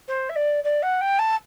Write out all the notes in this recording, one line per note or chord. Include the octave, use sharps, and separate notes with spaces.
C5
E5
D5
D5
F#5
G5
A5